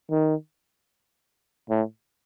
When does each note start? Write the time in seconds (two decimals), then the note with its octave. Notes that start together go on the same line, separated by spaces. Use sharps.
0.11 D#3
1.70 A2